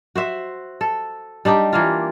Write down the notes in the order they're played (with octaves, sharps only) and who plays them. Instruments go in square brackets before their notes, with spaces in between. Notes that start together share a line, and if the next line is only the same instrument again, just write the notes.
[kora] F#4 C5 E5
A4
G3 D4 D#4 G4
E3 A#3 F4